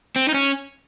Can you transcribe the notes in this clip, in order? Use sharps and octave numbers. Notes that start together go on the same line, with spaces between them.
C4
D#4
C#4